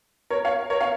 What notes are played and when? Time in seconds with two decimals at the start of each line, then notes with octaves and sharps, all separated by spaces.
0.30 A#4 C#5
0.45 C#5 F5
0.70 A#4 C#5
0.81 C#5 F5